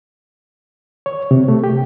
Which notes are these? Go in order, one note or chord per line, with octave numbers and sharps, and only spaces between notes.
C#5
C3
A3
G4